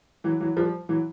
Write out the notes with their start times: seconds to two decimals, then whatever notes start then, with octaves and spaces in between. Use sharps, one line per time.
0.24 E3 F#3
0.40 E3 F#3
0.57 F3 G3
0.89 E3 F#3